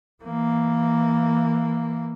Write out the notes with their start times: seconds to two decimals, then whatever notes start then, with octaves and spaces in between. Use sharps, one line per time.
0.24 E3 A#3